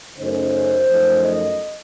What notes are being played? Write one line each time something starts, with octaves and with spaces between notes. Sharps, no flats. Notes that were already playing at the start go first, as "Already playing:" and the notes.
F#2 C#3 A3 D#4 C5
F#2 F3 A3 D#4
D#5